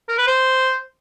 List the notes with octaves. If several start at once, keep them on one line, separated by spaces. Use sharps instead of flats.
A#4
B4
C5